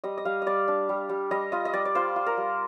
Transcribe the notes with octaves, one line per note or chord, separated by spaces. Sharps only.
G3 D#5
D#5
G3 F5
G3 D5 D#5
D4
G3
G3
G3 D#5
F4 D#5
D#5
G3 D5
D5
F4 C5
F4
A#4
G3